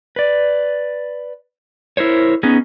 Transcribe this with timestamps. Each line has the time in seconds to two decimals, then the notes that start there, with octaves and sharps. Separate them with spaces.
0.16 B4 D5
1.97 E4 A#4 C5 C#5
2.43 B3 C#4 D#4 G#4